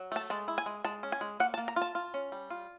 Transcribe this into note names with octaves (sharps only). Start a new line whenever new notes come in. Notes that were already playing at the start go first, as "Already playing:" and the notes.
Already playing: F#3
A3 A5
G#3 A5
E4
G#5
G#3
G#3 A5
C#4
G#5
G#3
A#3 F#5
A5
A#3
A#5
F4
A5
F4
C#4
G3
F4